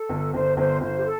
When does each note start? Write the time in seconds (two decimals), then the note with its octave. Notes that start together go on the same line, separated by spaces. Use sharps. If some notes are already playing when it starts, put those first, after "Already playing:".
Already playing: A4
0.10 G1
0.33 G1 C5
0.57 G1 C5
0.81 G1 C5
0.98 G4
1.05 A4